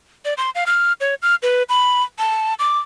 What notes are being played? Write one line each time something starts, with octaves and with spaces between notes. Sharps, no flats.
D5
C6
F5
F6
C#5
F6
B4
B5
A5
D6